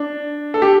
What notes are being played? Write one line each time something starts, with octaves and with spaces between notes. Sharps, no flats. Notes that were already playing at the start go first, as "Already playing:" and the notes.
Already playing: D4
A4
G4